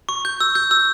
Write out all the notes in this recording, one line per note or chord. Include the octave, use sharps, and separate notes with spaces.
C#6
G6
E6
G6
E6